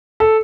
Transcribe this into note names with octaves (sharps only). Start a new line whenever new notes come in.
A4